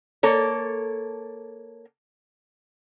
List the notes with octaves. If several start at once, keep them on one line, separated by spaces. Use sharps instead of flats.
A#3 A4 C#5